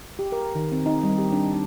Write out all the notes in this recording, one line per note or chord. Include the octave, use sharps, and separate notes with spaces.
G4
A#4
D#3
C4
D#4
G3
G4
D4
D#4